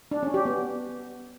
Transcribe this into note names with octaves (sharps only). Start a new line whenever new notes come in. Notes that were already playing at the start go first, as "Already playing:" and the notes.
D4
C#4
G4
B3